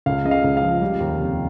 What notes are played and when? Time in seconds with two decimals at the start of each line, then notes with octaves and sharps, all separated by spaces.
0.06 C#2 F5
0.25 C#3 D#5
0.31 F5
0.44 C#2
0.57 F5
0.62 F3
0.82 G3
1.00 D#2
1.20 F1